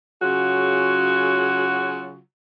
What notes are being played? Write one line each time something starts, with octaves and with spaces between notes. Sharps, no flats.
C#3 F#3 F4 F#4 G#4